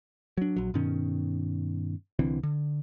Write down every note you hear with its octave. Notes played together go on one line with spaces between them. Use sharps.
F#3 D4
A#1 F#3
G2 B2 D#3 C#4
C2 D3 E3 C4
D3